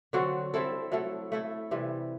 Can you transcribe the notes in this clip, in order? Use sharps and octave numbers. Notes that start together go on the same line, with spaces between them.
D3 F#3 C4 F#4
G3 C4 E4 A4
F#3 A3 E4 A4
A3 E4 A4
C3 E3 G3